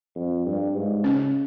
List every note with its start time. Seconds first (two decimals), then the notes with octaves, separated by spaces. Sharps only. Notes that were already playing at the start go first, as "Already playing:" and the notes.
0.15 F2
0.46 G2
0.75 G#2
1.04 C#3 C#4